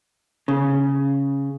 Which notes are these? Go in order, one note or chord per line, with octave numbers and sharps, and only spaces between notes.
C#3